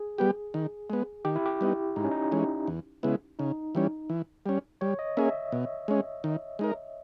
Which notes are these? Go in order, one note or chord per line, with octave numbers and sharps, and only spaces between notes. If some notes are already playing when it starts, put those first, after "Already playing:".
Already playing: G#4
G3 B3 G4
D#3
G#3 B3
D#3 G4
E4
G4
G3 B3 D#4
G#2 D#4
C#4
D#4
E3 G#3 C#4
E2
C#3 G#3 B3 E4
C#3 D#4
E3 G3 C#4
E3
G3 C#4
G3 C#5
D#5
A#3 C#4 G#4 E5
B2
G#3 C#4
D#3
G#3 D#4 A#4